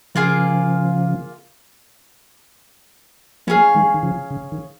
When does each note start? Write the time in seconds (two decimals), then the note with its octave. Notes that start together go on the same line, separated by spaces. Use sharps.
0.15 C#3 F3 A#3 F4 G#4 F5
3.47 F3 A#3 C#4 G#4 F5
3.75 D#3 G#3
3.94 D#3
4.03 C#3 F3
4.30 C#3
4.52 D#3